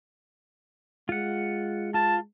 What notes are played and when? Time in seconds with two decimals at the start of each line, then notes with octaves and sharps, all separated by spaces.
1.09 G#3 F4 F#5
1.94 F4 A5